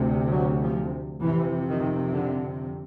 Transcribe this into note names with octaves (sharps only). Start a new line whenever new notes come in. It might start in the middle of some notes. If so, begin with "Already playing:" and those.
Already playing: D2 C3
F#3
F3
F2 C3 E3
D#3
D3